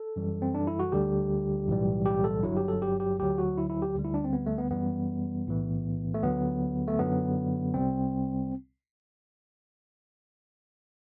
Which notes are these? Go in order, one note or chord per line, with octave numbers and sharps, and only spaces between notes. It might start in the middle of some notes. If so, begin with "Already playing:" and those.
Already playing: A4
F#2 E3 G3
C4
D4
E4
F#4
D2 D3 G3 G4
B1 A2 E3 G3
G4
A4
G1 G2 F#3 E4
G4
A4
G4
G4
D2 D3 F#3 G4
F#4
E4
E4
G4
D2 D3 G3
E4
D4
C4
B3
A3
B3
F#2 E3 G3 B3
B1 A2 E3
A3
D2 D3 F#3 B3
A3
F#2 D3 F#3 B3
C2 C3 G3 C4